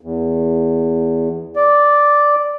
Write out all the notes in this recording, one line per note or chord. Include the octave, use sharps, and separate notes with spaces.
E2
D5